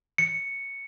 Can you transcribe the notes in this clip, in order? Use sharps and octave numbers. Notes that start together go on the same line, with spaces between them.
C#7